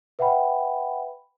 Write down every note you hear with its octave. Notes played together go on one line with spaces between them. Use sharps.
B4 E5 F#5 G5 B5